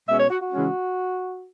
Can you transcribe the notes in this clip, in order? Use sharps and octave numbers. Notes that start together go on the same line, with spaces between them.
B2 G#3 C#4 E5
C#5
F#4
F#4
C#3 E3 G#3 C#4